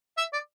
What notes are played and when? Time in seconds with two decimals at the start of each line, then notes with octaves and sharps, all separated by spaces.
0.18 E5
0.33 D5